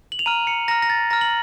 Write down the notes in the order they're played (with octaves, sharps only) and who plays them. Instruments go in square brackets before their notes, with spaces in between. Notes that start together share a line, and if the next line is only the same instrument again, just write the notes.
[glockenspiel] F#7
F7
A#5 F6 D#7
C#7
A#5 F6 A#6
A#6
A6
A#5 F6 A#6
F#7